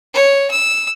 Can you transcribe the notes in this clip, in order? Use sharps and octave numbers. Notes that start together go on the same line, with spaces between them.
C#5
E6